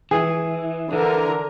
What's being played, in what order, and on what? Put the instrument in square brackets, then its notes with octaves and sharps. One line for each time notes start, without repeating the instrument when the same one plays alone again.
[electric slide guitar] E3 [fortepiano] G#4
[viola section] D3 A#4 [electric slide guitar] E3